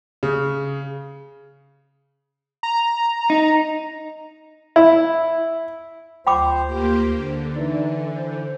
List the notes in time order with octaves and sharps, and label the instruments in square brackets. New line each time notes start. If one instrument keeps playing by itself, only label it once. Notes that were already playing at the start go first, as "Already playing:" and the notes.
[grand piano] C#3
[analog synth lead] A#5
[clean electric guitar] D#4
[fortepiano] E4
[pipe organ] D2 F4 [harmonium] C5 [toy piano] G5 B5 D6
[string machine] A#3 G4
D3
[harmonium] E3 [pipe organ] D#4 D5
[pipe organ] C5